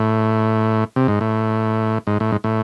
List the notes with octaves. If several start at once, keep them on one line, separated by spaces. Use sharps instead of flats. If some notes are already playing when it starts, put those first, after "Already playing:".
Already playing: A2
C3
G#2
A2
G#2
A2
G#2
A2